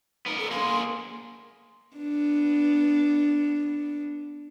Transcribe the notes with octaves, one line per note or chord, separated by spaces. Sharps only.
B3 D#4 A#4
A4
A#3 G#4 C6
B3 D4